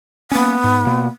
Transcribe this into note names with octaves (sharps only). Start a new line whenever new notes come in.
A#3 B3 C#4
G#2
B2 A#3